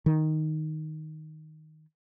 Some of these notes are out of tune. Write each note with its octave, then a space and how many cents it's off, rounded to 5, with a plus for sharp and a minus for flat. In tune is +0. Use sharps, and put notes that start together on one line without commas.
D#3 +0